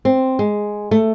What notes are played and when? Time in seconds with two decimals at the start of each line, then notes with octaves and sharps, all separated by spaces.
0.05 C4
0.39 G#3
0.91 A3